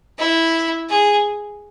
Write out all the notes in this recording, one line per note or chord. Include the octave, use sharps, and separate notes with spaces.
E4
G#4